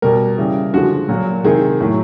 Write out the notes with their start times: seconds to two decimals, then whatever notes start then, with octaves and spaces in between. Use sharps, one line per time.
0.02 B2 G3 A#4
0.38 C#3 E3 G3
0.73 D3 F3 G#3 F#4
1.08 A#2 F#3
1.44 C3 D#3 G#3 G#4
1.80 A2 F#3